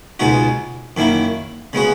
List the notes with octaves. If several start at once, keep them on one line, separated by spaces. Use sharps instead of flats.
C#2 B2 G#3 D#4 F#4
F#2 D#3 A#3 E4
C#3 G#3 B3 F#4